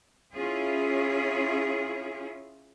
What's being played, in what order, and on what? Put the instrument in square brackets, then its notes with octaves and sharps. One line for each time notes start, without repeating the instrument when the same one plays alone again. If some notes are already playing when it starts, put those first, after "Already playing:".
[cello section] C#4 E4 F4 G#4